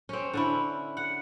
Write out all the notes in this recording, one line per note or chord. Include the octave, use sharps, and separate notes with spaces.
C4 C#4
D3 C#4 E4
F#5